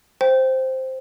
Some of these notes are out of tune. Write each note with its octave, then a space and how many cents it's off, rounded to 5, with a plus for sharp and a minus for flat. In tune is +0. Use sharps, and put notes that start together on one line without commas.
C5 +0 G5 +0